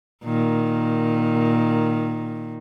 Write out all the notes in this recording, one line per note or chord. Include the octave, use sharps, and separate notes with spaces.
A#2 D#3